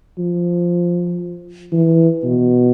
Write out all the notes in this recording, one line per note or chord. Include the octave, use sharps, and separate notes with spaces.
F3
E3
B2